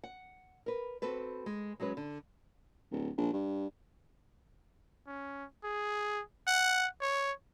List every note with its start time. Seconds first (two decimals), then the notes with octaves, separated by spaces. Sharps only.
0.03 F#5
0.66 A#4 B4
1.02 C4 F#4 A4 B4
1.46 G#3
1.80 F#3 G#3 C#4 B4
1.97 D3
2.91 D1
3.18 A#1
3.33 G2
5.07 C#4
5.64 G#4
6.47 F#5
7.01 C#5